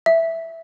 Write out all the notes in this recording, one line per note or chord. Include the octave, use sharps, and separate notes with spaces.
E5